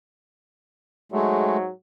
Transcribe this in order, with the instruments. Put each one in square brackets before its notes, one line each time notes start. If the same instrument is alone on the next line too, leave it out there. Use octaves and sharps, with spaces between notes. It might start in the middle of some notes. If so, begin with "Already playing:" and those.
[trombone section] G#2 F#3 [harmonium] G#3 A3